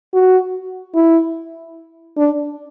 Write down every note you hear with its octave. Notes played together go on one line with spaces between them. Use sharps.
F#4
E4
D4